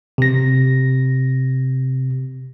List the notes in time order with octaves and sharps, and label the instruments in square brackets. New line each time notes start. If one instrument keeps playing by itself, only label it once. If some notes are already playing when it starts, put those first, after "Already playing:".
[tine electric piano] C3 A#6